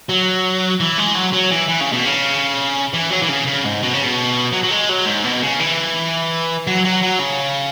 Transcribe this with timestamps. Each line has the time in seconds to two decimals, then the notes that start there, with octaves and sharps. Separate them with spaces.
0.09 F#3
0.80 E3
0.98 G#3
1.15 F#3
1.33 F#3
1.51 E3
1.69 E3
1.81 C#3
1.93 B2
2.05 C#3
2.93 E3
3.11 F#3
3.22 E3
3.28 C#3
3.47 C#3
3.64 G#2
3.83 B2
3.94 C#3
4.04 B2
4.53 F#3
4.64 F#3
4.71 G#3
4.89 F#3
5.06 G#2
5.25 B2
5.42 C#3
5.60 E3
6.67 F#3
6.85 F#3
7.03 F#3
7.19 C#3